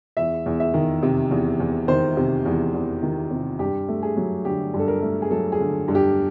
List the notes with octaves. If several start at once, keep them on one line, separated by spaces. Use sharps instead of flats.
E2 E5
E2
E5
D#3
C3
E2
E2
D#3 C5
C3
E2
E2
D#3
C3
G2 G4
A3
G#4
F#3
D3 G4
G2
A4
A#4
A3
G#4
F#3 A4
G#4
D3
G2
G4